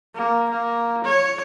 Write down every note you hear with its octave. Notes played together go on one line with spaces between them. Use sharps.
A#3
A#3
C#5